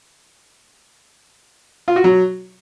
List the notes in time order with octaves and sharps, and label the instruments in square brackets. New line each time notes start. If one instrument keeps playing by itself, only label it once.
[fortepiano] F4
F#4
F#3